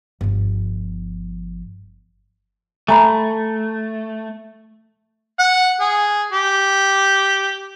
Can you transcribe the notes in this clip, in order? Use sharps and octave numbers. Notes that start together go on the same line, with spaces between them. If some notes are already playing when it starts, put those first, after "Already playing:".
G1 F3
A3 G#5 A#5 B5
F#5
G#4
G4